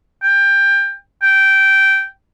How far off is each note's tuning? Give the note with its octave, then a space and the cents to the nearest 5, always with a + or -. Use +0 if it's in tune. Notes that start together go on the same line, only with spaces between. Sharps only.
G5 +20
G5 -10